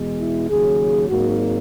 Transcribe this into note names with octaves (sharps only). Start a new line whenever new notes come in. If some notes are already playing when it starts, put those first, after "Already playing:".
Already playing: E2 B2 G#3
E4
D#2 C#3 F#3 G#4
G#1 G#2 D#3 F#3 A#3 F#4